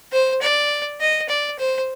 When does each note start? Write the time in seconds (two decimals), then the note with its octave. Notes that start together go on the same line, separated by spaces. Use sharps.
0.13 C5
0.42 D5
1.01 D#5
1.29 D5
1.59 C5